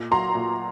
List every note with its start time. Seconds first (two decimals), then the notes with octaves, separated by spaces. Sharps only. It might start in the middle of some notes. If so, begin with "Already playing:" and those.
Already playing: A#2
0.11 F#3 A#5 C6
0.35 A#2